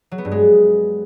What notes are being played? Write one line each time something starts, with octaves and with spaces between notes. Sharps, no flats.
F#3
B3
G2
G#3